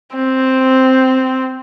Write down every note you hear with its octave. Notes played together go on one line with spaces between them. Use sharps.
C4